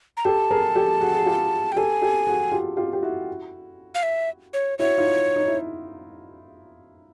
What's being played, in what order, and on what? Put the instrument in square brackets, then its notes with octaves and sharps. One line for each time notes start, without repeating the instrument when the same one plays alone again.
[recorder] A#5
[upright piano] G4 A4 [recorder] A5
[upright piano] G#4 A#4
G4 A4
F#4 G#4
G#4
F4 G4
[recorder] G5
[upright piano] G4 A4 [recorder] G#5
[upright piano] G4 A4
F#4 G#4
F4 G4
F4 G4
G4
E4 F#4
[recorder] F5
E5
C#5
[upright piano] E4 F#4 [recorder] C#5
[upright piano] D#4 F4
D#4
E4